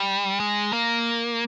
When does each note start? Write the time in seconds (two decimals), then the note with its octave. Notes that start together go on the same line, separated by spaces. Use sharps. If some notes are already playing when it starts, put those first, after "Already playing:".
Already playing: G3
0.40 G#3
0.73 A#3